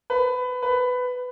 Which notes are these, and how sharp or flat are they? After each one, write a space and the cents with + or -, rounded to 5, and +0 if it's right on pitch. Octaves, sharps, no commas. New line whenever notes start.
B4 +20
B4 +15